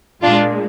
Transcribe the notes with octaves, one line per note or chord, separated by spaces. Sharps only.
A#2 G#3 D4 F4